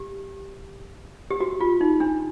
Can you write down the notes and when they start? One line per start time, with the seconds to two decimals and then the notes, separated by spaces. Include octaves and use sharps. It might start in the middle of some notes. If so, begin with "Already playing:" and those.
Already playing: G4
1.31 G4
1.40 F#4
1.61 F4
1.81 D#4
2.00 D4